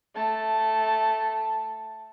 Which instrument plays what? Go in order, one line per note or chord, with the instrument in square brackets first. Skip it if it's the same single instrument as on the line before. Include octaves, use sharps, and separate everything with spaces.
[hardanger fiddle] A3 A5